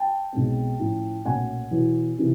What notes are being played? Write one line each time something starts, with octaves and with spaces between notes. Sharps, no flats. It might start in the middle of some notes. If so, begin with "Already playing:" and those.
Already playing: G5 A5
B1 B2 G#3 C4
A2 F3 A3 C#4
B1 A#2 F#3 A3 C#4 F#5 G#5
E2 B2 F#3
C3 E3